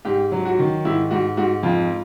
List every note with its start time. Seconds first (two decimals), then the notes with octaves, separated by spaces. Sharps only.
0.05 G#2 G4
0.32 F#3
0.45 F#4
0.59 D#3
0.85 G#2 E4
1.11 G#2 F#4
1.37 G#2 F#4
1.63 F2 F4